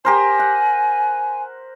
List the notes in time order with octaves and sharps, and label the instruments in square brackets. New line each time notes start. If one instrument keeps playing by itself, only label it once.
[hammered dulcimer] G4 A#4 C5 [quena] G#5
[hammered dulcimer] F#5